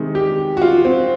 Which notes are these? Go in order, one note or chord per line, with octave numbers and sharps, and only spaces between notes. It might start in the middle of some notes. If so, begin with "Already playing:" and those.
Already playing: C3 D#3 G#3
G4
F#4
F4
C4